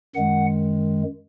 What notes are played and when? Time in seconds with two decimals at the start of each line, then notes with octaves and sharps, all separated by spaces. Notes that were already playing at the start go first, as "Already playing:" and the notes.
0.15 F#2 D#3 G#3 F#5